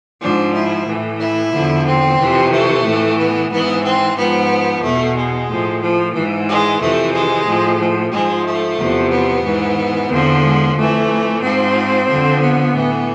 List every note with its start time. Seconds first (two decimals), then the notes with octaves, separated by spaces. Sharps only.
0.21 G#2 F3 D4
0.54 E4
0.87 A2 E3
1.19 E4
1.53 E2 D3 F3
1.86 C4
2.18 F2 C3 E3
2.51 A3
2.84 A2 E3
3.17 B3
3.50 G#2 E3 B3
3.83 C4
4.16 G#2 F3 B3
4.82 E2 B2 A3
5.15 G#3
5.48 A2 F3
5.81 F3
6.14 G#2 E3
6.47 G#3
6.80 F2 C3 E3 A3
7.13 G#3
7.46 A2 F3
7.79 F3
8.11 G#2 F3 G#3
8.44 A3
8.77 E2 C3 F3
9.10 B3
9.43 G#2 E3
10.09 E2 D3 F3 C4
10.43 G#3
10.75 F2 E3 A3
11.41 G#2 F3 C4
12.07 F2 D3 F3
12.41 B3
12.74 A2 E3